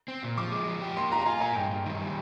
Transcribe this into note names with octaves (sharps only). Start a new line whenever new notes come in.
C4
A#2
F3 D6
G#3
F3
G4
A#3 C6
F4 A#5
A#5
F4 G#5
A#3 G#5
G2 G5
G2
D#3
G3